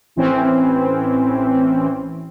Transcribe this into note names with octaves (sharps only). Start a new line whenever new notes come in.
A1 E3 C4 C#4